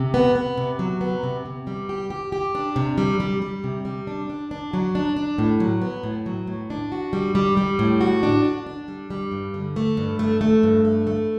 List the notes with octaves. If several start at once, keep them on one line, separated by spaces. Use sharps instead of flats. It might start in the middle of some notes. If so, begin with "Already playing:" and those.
Already playing: C3
B3
B3
C3
F#3
B3
C3
C3
G3
G4
G4
G4
D4
C3
G3
G3
G3
C3
G3
D4
D4
D4
F#3
D4
D4
A2
F#3
B3
A2
F#3
A2
D4
F#4
G3
G3
G3
A2
F#4
D4
D4
D4
G3
G3
G2
D3
A3
G2
A3
A3
G2
A3
A3